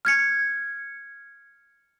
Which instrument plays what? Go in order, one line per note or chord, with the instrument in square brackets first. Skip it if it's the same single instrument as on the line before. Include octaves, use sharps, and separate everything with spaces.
[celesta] F6 G#6 C#7